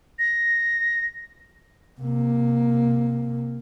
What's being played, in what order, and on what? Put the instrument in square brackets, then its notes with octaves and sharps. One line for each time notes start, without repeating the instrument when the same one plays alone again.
[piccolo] A#6
[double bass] C3 A#3